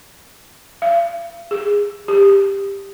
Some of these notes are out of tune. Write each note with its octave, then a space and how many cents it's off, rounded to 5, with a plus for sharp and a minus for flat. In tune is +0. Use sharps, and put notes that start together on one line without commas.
F5 -45
G#4 -25
G4 +10